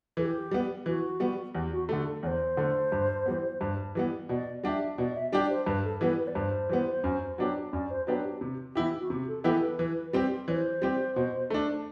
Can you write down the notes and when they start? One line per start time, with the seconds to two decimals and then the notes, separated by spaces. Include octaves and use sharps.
0.17 E3 A4
0.22 G4
0.51 G3 B3
0.86 E3 F#4
1.20 G3 B3
1.54 E2 G4
1.72 F#4
1.89 D3 A3 G4
2.06 A4
2.23 E2 C5 D5
2.57 D3 A3
2.92 G2
3.26 E3 G3 B3
3.61 G2
3.95 E3 G3 B3
4.29 B2 D5
4.64 G3 D4 G4 E5 F#5
4.98 B2 D5
5.15 E5
5.32 G3 D4 G4 D5
5.49 C5
5.66 G2 B4
5.84 A4
6.01 E3 G3 B3 B4
6.18 B4
6.27 D5
6.35 G2 C5
6.69 E3 G3 B3
7.04 F#2
7.38 F#3 B3 D4 G4
7.73 F#2 D5
7.89 C5
8.07 F#3 B3 D4 G4 B4
8.24 G4
8.41 C3
8.75 E3 B3 E4 G4
8.99 F#4
9.10 C3 G4
9.27 A4
9.44 E3 B3 E4 G4 A4
9.61 B4
9.79 E3
10.13 G3 C4 G4
10.48 E3 D5
10.51 C5
10.82 G3 C4 G4
11.16 B2
11.50 A3 D4